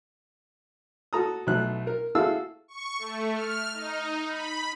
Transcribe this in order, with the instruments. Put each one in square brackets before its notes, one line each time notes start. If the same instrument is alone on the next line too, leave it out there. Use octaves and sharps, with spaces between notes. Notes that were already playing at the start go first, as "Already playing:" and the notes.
[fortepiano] F#4 A4 A#5 D#6
B1 B2 A3 F#6
A#4
E4 F#4 G#4 A4 F5 E6
[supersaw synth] C#6
A3
F6
D#4
B5